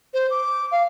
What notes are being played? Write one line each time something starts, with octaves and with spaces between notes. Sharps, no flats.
C5
D6
F5